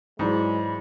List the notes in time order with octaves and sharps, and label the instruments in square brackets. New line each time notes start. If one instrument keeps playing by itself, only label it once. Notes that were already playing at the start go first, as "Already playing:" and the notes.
[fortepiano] G#2 [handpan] E3 F#3 D5 [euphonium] G#3 [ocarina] B5